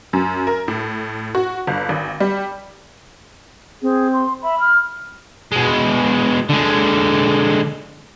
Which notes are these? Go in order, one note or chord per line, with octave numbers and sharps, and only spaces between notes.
F#2
A#4
A2
F#4
G1
G#1
G3
C4 G#4
C6
E5 B5
F6
B2 G#3
D3 G#3